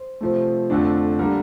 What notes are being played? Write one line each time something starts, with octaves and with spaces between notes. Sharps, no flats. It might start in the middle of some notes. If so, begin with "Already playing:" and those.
Already playing: C5
C3 F3 A3
F2 D3 A3 D4
D3 G3 A#3 D4 A#4